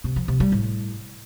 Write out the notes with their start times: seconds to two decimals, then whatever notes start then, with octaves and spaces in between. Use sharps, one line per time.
0.04 C3
0.16 F3
0.28 C3
0.40 G3
0.52 A2